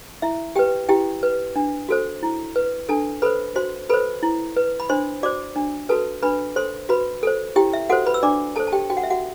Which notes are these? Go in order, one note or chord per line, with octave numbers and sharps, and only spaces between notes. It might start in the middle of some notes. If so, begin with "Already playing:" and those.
E4 E5
G4 B4 G5
E4 G4 G5
B4
D4
F#4 A4 C5
E4
B4
D4 A4 A5
A4 B4 C5 B5
F#4 C5 C6
A4 B4 C5 B5
E4
B4
B5
D4 C5 C6
F#4 C5 D5 D6
D4
F#4 A4 B4 A5
D4 B4 B5
A4 C5 C6
F#4 B4 B5
A4 C5
E4 G4 G5
E5
F#4 A4 C5 F#5
B4 B5
E6
D4 D5 D6
A4 C5 A5
A5
G4 G5
F#4 G5
F#5
E5
F#4 F#5